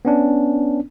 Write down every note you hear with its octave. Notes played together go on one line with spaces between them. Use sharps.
B3 C#4 D4